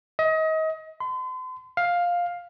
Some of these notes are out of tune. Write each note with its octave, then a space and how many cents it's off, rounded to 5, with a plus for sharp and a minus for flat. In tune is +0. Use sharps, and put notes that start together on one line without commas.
D#5 +30
C6 -40
F5 +10